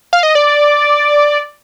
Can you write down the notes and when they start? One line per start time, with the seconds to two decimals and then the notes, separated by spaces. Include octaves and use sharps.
0.13 F5
0.23 D#5
0.35 D5